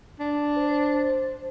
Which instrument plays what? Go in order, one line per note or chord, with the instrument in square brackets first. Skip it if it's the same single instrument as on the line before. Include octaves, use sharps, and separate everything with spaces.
[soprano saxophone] D4
[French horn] C5